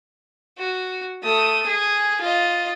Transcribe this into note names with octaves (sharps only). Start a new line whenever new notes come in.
F#4
A3 D#6
G#4
F4 D#5